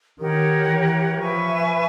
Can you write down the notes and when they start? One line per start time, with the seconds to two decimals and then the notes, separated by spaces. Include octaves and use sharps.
0.19 D#3 G4 A#4 C#5 F#5
0.68 E3
1.18 F3 B4 E5 G#5 C#6